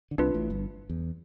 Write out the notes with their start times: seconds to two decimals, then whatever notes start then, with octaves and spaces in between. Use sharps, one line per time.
0.11 D3
0.18 C2 C3 D4 F4 B4
0.34 A1 A2
0.50 G1 G2
0.90 E2